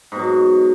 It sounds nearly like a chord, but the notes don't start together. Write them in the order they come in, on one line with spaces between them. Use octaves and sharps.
G#2 B2 F#3